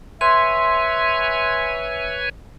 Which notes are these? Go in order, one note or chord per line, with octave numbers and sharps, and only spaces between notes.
B4 C#5 E5 G#5 C6